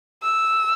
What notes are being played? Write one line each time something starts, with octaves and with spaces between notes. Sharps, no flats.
E6